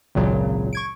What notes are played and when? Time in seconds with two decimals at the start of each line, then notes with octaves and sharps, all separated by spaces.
0.15 G#1 C#2 A#2 C#3 F#3
0.73 C#6 G#6 D7